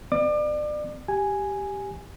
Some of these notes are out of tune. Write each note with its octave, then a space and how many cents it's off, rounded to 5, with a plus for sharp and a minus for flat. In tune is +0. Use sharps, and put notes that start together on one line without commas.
C4 -45 D5 +30 D6 +35
G4 +0 G#5 +0